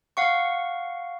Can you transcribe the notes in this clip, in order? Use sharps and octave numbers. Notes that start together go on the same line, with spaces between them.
F5 F#5 C#6